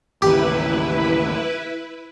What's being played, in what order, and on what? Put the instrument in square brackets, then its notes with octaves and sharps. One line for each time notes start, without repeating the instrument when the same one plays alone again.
[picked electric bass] A1 D#2 C#3 [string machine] E4 B4 [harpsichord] G4